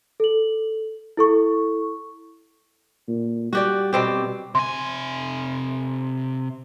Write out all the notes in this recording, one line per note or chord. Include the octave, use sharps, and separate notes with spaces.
A4 F#7
E4 A4 C#6
A#2
G3 F#4 G4 D5
B2 C4 G4
C3 G#5 C6